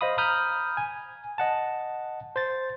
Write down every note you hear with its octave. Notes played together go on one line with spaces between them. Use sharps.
C5 D#5 F5 B5 D#6
A#5 B5 D#6 F6 G6
G#5
D#5 F#5 A5
C5 A6